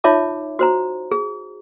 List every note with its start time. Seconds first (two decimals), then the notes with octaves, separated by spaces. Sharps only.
0.04 D#4 F4 C#5 E5 A5 D6
0.59 F#4 C5 A#5
1.12 G#4